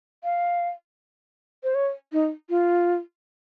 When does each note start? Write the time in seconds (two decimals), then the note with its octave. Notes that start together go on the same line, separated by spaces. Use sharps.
0.24 F5
1.64 C5
1.75 C#5
2.13 D#4
2.50 F4